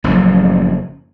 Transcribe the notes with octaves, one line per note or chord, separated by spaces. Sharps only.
F#1 F#2 A2 F3